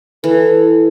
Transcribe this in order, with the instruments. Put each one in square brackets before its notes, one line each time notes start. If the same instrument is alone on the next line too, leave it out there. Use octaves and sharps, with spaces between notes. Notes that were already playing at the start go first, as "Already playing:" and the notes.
[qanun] E3 [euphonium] A4